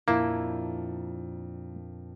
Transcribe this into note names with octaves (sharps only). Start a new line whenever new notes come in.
F2 A#2 A#3 D4 E4